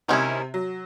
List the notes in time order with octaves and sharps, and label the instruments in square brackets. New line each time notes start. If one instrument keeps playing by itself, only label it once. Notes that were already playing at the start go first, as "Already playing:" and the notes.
[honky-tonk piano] C3 [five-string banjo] D#3 G#3 C#4 E4
[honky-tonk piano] F#3